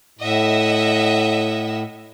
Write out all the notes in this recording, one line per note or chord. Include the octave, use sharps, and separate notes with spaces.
A2 D#5 E5 F#5